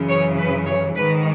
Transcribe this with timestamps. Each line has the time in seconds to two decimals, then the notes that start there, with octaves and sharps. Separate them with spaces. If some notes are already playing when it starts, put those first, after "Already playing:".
Already playing: F#2 C#3 E3
0.09 C#5
0.38 B4
0.66 C#5
0.95 G#2 D#3 B4